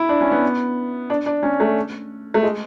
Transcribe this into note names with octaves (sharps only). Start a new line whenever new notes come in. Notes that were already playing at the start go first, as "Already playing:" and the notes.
Already playing: E4
D4
C#4
B3
D4
D4
C#4
A3
A3
G#3